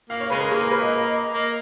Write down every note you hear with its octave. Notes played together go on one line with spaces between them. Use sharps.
A#3 F5
C#5
C#3 G#3 B4
A#4
A#3 G#4
A#4
B4
D#5
A#3